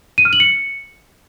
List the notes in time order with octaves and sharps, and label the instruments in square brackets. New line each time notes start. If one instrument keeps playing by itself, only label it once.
[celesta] D#7
F6
F#7
C#7